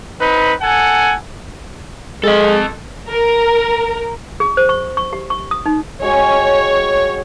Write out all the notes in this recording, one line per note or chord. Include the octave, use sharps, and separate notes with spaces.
C4 D#4 B4
A4 F#5 G#5
G#3 A4 D#5
A#4
G#4
C5
C#6
C#6
G4
C#6
D#6
D#4
G#3 F#4 G4 C#5